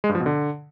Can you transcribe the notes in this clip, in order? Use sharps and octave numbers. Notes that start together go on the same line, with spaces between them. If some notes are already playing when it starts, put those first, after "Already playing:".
G#3
G2
F3
B2
D3